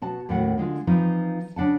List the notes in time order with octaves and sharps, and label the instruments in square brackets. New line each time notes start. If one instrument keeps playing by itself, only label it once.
[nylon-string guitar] B2 F#4 A5
D#2 A2 C#4 F#4 F#5
D3 G#3 F4
E3 F3 C4 D#4 F4
C#3 D4 F#5 A5